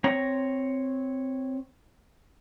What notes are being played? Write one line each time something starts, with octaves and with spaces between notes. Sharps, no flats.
C4 C#5 A#5